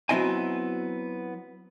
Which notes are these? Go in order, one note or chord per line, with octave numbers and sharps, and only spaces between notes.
F#3 B3 C4 E4 D#5 G#5